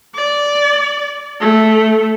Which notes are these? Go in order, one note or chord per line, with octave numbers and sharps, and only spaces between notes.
D5
A3